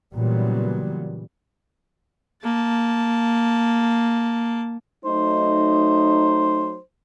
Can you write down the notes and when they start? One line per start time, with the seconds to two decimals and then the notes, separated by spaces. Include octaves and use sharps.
0.13 A#2 C#3 E3 F#3 G3 B3
2.44 A#3 A5
5.05 F#3 A3 D#4 C5